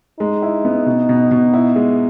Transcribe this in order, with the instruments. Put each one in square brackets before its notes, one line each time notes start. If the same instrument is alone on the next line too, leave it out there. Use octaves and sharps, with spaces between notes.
[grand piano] G#3 [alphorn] D#4
[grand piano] E4
B3
B2
B2
B2
E4
G#3